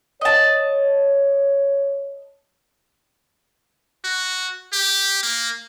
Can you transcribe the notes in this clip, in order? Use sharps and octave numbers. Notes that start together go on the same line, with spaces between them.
C#5 D#5 A5
F#4
G4
A#3